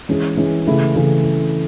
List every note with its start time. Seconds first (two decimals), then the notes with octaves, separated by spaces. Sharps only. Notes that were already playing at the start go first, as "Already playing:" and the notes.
0.09 E3 G#3 C#4 G#4
0.37 E3 G#3 C#4 G#4
0.66 C#3 E3 A3 E4 G#4
0.95 C#3 E3 A3 E4 G#4